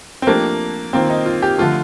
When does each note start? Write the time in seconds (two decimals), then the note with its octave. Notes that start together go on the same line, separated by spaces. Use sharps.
0.22 C4
0.27 F3 A3 A#3 D4 G4
0.93 D#3 A#3 C4 F4
1.10 D#4
1.26 F4
1.42 G4
1.58 D3 F3 A3 F4